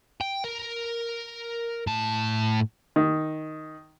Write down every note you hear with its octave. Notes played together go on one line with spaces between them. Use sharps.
G5
A#4
A2 A5
D#3